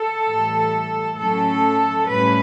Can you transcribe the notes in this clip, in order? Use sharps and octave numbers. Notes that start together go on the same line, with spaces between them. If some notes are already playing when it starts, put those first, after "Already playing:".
Already playing: A4
A2 E3 G3
A2 F#3 C#4 A4
A2 G3 C#4 B4